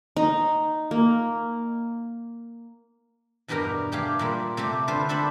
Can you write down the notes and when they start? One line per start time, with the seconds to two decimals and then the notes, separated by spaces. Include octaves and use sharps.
0.17 D#4
0.91 A#3
3.48 E2 G2 B2 G4 A#4 A#5
3.92 A3 G4 G#4 F5
4.19 A#2 G3 A#3
4.57 C3 A3 G4
4.88 D3 F4 A4 B4 C5
5.09 G3 D4 A4 C5 E5 B5